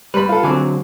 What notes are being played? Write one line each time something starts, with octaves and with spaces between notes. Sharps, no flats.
G3 B4 B5
F4 A4
D3 F#3 C4 G#5 D6